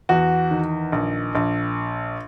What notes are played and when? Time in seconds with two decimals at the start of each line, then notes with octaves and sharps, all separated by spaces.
0.09 E2 F#4
0.51 D#3
0.92 A#1
1.35 A#1